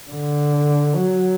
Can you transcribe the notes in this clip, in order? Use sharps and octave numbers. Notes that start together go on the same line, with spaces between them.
D3
F#3